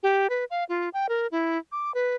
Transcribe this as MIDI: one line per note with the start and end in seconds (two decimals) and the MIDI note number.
0.03 0.27 67
0.30 0.45 71
0.50 0.64 77
0.69 0.89 65
0.93 1.07 79
1.09 1.27 70
1.32 1.58 64
1.72 1.94 86
1.95 2.16 71